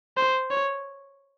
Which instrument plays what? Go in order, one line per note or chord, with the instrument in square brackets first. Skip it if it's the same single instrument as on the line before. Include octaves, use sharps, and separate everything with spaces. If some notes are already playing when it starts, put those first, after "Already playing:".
[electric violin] C5
C#5